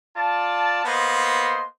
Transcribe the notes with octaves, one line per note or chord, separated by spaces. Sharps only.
F4 D5 A5
A#3 B3 C5 D#5 C6